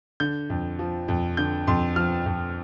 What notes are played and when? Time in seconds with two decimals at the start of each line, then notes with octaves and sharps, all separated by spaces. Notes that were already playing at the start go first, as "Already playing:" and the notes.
0.20 D3 G6
0.50 F2
0.79 F3
1.08 F2
1.37 D3 G6
1.67 F2 C6
1.96 F3 F6
2.26 F2